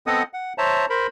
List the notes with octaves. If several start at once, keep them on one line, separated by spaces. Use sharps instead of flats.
B3 C4 A4 D#5 F#5 D#6
F#5
C5 C#5 E5 A5 A#5
A#4 C5 B5